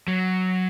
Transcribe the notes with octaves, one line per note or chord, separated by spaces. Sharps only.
F#3